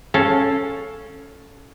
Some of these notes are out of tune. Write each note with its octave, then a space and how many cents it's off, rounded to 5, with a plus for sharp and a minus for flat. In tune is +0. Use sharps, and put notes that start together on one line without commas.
C#4 +0 A4 +0 F5 +15